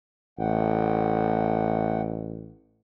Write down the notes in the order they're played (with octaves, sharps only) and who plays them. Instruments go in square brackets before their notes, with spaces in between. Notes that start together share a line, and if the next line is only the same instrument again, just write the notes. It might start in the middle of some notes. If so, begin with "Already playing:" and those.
[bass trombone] A1 [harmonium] A3 F#5 G5